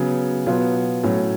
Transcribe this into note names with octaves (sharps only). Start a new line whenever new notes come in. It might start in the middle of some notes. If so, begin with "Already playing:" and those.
Already playing: C#3 F#3 B3
B2 F#3 B3 F4
A2 F#3 C#4